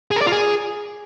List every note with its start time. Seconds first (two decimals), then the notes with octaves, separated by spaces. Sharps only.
0.11 G#4
0.16 A#4
0.21 D5
0.27 F4
0.32 G#4